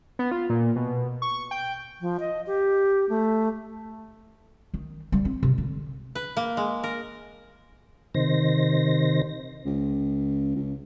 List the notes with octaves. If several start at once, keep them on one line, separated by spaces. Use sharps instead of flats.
B3
F4
A#2
B2
C#6
G5
F3
D#5
G4
A3
D#3
G3
C4
C3
D3
B4
A#3
G#3
A#4
C3 D#3 C5 A#6
C#2
C#2